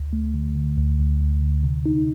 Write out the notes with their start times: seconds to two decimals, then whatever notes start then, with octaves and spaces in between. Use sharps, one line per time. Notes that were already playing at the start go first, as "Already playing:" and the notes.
Already playing: D2
0.13 A3
0.34 D3
0.55 D3
0.77 D2
0.99 D2
1.21 D2
1.42 D3
1.63 C3
1.86 D#4